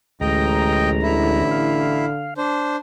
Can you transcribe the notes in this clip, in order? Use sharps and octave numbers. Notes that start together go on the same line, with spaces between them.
A1 D2 G#3 D#5 G5 A#5
D3 E4
F5
D4 C5